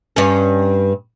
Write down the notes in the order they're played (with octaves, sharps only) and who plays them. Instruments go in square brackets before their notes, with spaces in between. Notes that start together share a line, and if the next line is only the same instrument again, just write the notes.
[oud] G2 C#4